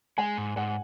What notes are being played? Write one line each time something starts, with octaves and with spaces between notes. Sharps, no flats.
G#3 G#5
G#2
G#2 F#5